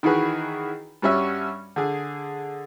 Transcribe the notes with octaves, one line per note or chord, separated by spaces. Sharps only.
D#3 E3 D#4 F#4 G#4 B4
G2 G3 C#4 F#4 E5 F#5
D3 G#4